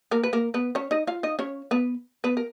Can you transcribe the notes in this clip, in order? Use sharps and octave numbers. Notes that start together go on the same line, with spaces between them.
A#3 A#4
B4
A#3 A#4
B3 B4
C#4 C#5
D#4 D#5
F4 F5
D#4 D#5
C#4 C#5
B3 B4
B3 B4
A#4